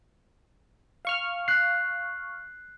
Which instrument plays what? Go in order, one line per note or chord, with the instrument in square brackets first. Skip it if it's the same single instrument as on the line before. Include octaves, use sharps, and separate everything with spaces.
[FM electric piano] F5 C#6 F6
[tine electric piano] F#6 C7